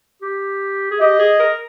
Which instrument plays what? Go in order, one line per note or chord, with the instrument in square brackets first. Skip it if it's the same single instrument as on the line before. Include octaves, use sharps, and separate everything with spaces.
[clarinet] G4
G#4
[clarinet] G4 [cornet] D#5
[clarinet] G#4
A#4